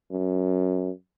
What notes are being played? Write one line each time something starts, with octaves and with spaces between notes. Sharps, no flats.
F#2